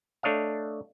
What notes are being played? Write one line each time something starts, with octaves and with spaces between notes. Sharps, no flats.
A3 D4 C#5 D#5 F5